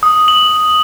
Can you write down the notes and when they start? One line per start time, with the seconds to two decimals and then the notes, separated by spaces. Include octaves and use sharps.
0.03 D#6
0.28 F#7